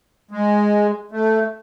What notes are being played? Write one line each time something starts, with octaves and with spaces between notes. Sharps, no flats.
G#3
A3